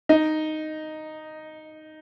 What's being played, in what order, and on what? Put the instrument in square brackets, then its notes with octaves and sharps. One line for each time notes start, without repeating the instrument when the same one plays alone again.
[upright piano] D#4